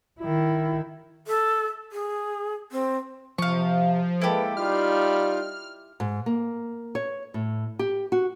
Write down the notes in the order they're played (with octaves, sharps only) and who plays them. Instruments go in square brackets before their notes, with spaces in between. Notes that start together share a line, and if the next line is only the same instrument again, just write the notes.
[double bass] D#3 E4
[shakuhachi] A4
G#4
C4
[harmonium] C3 [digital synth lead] F3 [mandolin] F5 C#6
[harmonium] G#3 A#3 A4 [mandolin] E4 G4 [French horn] B4
[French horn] G3 [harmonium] D#4 F4 F5 [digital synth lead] F6
[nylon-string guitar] G#2
A#3
C#5
A2
G4
F#4